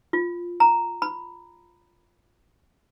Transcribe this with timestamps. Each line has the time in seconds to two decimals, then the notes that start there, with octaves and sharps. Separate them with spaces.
0.13 F4
0.60 A#5
1.02 B5